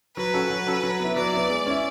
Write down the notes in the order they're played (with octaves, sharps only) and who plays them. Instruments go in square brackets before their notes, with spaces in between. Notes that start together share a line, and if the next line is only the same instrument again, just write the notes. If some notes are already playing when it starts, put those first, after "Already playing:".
[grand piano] F#3 [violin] B4
[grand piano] C#4 F#4 A4
F#3
C#4 F#4 A4
F#3
B3 E4
[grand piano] F#3 [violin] D5
[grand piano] B3 E4
G#3
C#4 E4